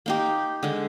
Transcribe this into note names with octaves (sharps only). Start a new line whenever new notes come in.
A#3 D#4 G4
D3 G#3